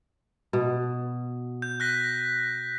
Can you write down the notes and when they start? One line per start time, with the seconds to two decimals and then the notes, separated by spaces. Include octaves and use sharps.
0.53 B2
1.62 G6
1.80 F#6 A#6 B6